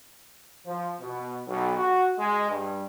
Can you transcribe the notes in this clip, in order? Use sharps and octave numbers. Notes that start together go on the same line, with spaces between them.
F3
B2
B1
F#4
G#3
G2